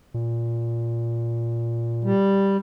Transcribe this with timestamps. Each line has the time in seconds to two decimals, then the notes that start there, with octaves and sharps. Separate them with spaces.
0.14 A#2
2.04 G3